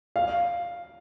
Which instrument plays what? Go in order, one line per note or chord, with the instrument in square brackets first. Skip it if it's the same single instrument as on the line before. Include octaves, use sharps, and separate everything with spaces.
[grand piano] F5